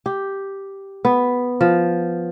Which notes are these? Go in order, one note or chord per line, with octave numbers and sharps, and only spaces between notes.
G4
B3
F3